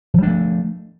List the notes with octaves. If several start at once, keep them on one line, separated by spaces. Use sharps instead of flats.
F3 G3 A3 D4